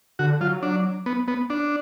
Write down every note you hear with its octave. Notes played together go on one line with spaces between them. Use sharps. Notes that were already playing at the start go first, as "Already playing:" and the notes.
D3 F#4
F#3 F4
D4
B3
B3
D4